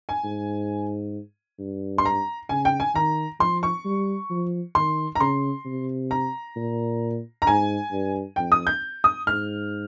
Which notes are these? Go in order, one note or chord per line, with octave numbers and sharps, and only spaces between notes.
G#5
G#2
G2
C6
A#5
C#3 G#5
G5
G#5
D#3 A#5
F3 C6
C#6
G3
F3
D#3 C6
A#5
C#3 C6
C3
A#5
A#2
A#5
G#2 G#5
G2
F2 G5
D#6
G6
D#6
G#2 F6